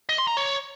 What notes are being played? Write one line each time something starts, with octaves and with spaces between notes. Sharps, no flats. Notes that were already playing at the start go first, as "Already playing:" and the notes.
D#5
C6
A#5
C#5